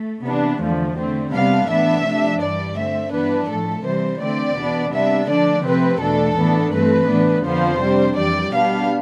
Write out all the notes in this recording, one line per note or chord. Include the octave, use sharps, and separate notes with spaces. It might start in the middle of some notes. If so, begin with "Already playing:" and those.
Already playing: A3
C3 E3 B3 D4
E2 D3 F3 A3
D3 A3 C4
C3 G3 B3 D4 F5
A2 E3 B3 D4 E5
C3 F3 A3 D4
G2 E3 G3 D5
D3 A3 C4 E5
G2 E3 B3 D4 B4
A2 F3 A3 A4
C3 E3 G3 C5
D3 A3 C4 D5
E2 B2 B3 D4
C3 G3 B3 D4 E5
D3 F3 A3 D4 D5
C3 F3 A3 C4 B4
E2 B2 A3 D4 A4
A2 E3 B3 D4
G2 E3 A3 C4 B4
A2 E3 B3 D4
F2 D3 F3 B3 C5
C3 G3 D4
F2 E3 G3 D5
B2 G3 B3 D4 F5